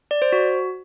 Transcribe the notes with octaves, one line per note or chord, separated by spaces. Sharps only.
D5
C5
F#4